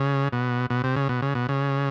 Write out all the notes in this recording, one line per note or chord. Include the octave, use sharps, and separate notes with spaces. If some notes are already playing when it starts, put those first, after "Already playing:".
Already playing: C#3
B2
B2
C3
C#3
B2
C#3
B2
C#3